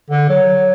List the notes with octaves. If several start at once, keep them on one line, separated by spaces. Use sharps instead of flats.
D3
F#3